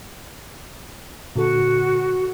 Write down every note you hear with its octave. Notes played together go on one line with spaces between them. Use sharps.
A#2 D3 F#4 A4